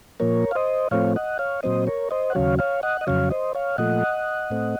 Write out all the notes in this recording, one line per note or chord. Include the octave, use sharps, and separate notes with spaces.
A#2 F3 A#3 A#4 C#5
F5
C5 D#5
A2 F3 A3 C4 C#5 F5
D#5 F#5
C#5 F5
A#2 F#3 C4 C5 D#5
A#4 C#5
C5 D#5
F#5
D#2 C#3 F#3 C#5 F5
C#5 F5
D#5 F#5
D#5
F2 C#3 F#3 C#5 F5
C5 D#5
C#5 F5
A#2 F3 A3 D#5 F#5
A2 A3 C4